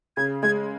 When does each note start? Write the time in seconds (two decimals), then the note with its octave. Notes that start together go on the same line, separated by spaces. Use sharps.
0.17 C#3 G#6
0.43 G#3 G#6